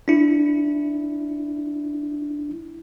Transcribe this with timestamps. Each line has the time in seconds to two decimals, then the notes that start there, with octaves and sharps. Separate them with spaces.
0.08 D4 E4